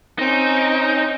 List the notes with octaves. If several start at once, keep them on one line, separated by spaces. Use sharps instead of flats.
C4 C#4 D#4